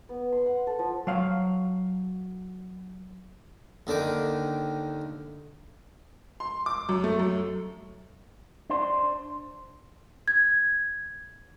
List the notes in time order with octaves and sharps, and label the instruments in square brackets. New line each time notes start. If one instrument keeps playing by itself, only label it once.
[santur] B3
C6
F#5
A4
F3
[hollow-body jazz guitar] F#3 F5
[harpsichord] D#2 D3 D#3 D6
[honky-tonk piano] C6
D6
F#2
A3
F#2
[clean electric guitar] D4 C5
[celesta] G#6